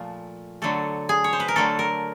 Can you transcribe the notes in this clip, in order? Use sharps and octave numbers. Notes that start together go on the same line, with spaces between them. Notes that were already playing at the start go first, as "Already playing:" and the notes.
Already playing: A#2 F3 A3
D3 F#3 A3 A4
G#4
C#5
C5
B4
A#4
D3 F#3 A3 A4
A#4